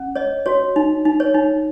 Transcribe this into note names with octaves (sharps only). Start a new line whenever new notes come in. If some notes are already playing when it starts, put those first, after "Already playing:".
Already playing: C#4
C#5 D#5
F#4 C#5
D#4
D#4
C#5
D#4